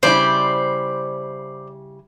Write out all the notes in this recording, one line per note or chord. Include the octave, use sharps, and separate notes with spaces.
C#3 G3 E4 C5 D5